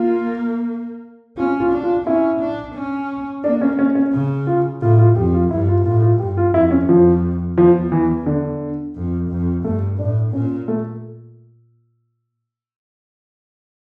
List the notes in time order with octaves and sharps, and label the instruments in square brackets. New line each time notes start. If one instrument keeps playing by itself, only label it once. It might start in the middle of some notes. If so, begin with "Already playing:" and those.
Already playing: [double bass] A#3 [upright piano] F4
[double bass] C#4 [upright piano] F4
[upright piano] F4
[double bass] D4
[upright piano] F4
[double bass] C#4 [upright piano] E4
[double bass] D4
C#4
[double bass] A#3 [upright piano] D4
[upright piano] C#4
C#4
C#4
[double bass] C#3
[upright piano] F4
[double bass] A2 [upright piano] F4
[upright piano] F4
[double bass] F2 [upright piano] G4
[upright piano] F4
[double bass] G2 [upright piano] E4
[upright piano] F4
[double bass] A2 [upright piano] F4
[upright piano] F4
[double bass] G2 [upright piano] G4
[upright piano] F4
[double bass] F2 [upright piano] E4
[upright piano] C#4
[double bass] F2 [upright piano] F3
[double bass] E2 [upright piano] F3
[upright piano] E3
D3
[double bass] F2
F2
[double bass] G2 [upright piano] A3
[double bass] A2 [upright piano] D4
[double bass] A#2 [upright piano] C#4
[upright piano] A3